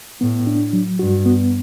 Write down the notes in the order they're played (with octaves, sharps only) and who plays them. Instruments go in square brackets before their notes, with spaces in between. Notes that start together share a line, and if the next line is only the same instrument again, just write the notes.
[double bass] A2 [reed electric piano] B3
[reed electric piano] D4
F#3
[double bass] G2 [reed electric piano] F#4
[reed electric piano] B3